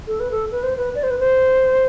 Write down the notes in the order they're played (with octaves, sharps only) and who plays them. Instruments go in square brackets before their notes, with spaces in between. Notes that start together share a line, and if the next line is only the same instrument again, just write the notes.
[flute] A4
B4
A4
B4
C5
B4
D5
C5
B4
C5